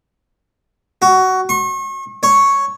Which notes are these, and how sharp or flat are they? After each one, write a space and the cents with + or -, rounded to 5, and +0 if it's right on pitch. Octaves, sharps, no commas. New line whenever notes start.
F#4 +15
C#6 -40
C#5 +0